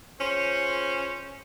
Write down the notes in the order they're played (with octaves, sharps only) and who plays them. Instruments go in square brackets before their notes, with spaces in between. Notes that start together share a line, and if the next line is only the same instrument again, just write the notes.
[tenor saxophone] C#4 [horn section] F4 G#4 C5